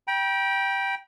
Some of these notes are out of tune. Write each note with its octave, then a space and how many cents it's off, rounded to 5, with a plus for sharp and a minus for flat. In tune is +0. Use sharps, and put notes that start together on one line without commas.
G5 +0 B5 -45